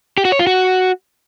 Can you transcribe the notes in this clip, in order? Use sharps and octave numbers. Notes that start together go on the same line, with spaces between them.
G4
F#4
C#5
F4
F#4